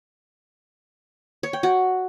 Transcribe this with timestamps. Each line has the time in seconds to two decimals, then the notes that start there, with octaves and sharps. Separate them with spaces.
1.43 C#5
1.53 G5
1.63 F#4